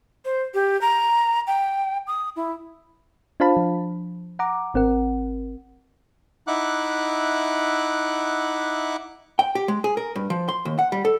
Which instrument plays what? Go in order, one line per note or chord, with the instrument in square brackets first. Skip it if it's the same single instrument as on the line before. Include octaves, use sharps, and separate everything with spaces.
[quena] C5
G4
A#5
G5
D#6
E4
[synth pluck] D4 F4 C5 F5 A5 B5
F3
F#5 A#5 D6
G#1 C4 A#4 F#5
[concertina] D#4 E4 E5 F#5 D6 F#6
[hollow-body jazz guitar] G5
G4
G#3
G#4
A#4
G2
F3
C6
D#2
F#5
G3
A4